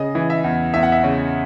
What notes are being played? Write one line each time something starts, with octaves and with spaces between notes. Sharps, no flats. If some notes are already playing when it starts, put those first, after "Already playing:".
Already playing: C#3 D#5
E3
E5
E2
E2 E5
F#5
E5
C#3